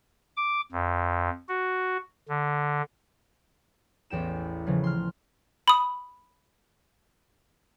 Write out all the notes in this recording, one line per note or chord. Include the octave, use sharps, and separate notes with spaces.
D6
F2
F#4
D3
A1 E2 G5 E7
C#3 E3 F3
C6 F6
B5 D#6